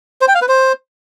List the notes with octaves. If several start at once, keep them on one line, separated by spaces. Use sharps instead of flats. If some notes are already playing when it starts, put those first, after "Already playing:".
C5
G5
F5
B4
C5